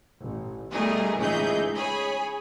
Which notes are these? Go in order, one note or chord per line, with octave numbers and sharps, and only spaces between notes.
A1
B2 G3 A3 D#4 G#4 A#4
C#2 A2 E3 D#4 G#4 G6
G#4 C#5 G#5 B5